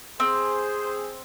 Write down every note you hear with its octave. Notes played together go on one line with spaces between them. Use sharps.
C4 G#4 C5